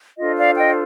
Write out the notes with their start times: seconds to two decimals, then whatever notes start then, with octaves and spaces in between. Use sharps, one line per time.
0.18 D4 F4 A4 C5 D#5
0.37 D5 F5
0.57 D#5 G5